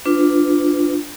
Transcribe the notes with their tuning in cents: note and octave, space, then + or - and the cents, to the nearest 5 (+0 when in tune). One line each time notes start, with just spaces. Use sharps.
D4 +0 F4 +0 B4 +30